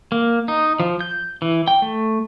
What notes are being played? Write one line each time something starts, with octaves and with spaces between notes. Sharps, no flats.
A#3
D#4
F3
G6
E3
G5
A3